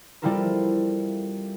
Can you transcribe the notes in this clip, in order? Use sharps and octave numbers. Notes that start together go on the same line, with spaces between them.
G3 C4 E4 F4 A4 A#4